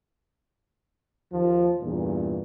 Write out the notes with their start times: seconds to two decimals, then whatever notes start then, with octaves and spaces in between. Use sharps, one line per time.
1.32 D#2 F3
1.82 E2 G2 A#2